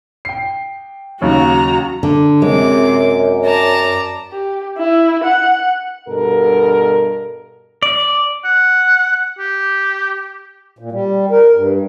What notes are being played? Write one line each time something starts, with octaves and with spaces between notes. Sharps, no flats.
G5 C7
D#2 C#3 F#3 F#4 A#5
D3
F#2 C3 G#3 D6
D5 A5 A#5
G4
E4
F#5
G2 B2 A4 A#4
D5
F#5
G4
A#2
G3
A#4
G2